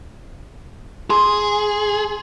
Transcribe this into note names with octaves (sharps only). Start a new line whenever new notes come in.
G#4 C6